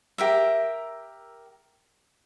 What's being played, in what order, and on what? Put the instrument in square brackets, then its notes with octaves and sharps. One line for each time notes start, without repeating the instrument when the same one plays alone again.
[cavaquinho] G4 A#4 E5